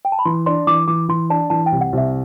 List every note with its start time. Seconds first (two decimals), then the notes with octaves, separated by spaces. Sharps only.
0.05 G5
0.12 A5
0.19 B5
0.25 E3 C6
0.46 D4 C6
0.67 E3 D6
0.88 E3 D6
1.09 E3 C6
1.30 D4 A5
1.50 E3 A5
1.66 G5
1.72 C2
1.81 F#5
1.93 C2 E5